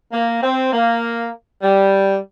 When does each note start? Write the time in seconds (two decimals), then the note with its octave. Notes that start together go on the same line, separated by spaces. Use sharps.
0.12 A#3
0.41 C4
0.72 A#3
1.63 G3